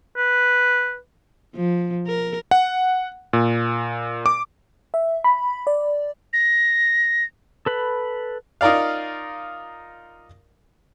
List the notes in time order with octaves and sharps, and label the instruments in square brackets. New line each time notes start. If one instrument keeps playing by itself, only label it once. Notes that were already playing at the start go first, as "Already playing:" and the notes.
[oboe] B4
[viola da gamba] F3
A#4
[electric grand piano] F#5
A#2
D6
[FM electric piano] E5
B5
D5
[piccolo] A#6
[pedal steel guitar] A4 B4 B5
[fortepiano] D#4 F4 A#4 D5 F5